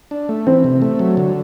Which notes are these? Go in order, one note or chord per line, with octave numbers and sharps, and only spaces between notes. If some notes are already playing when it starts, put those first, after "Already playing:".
D4
A3
E3 C4
C3
A3
F#3
D3